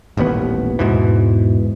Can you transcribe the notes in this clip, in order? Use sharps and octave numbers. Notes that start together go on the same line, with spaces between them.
D#1 A1 D#2 B3
E2 G#2 B2 E3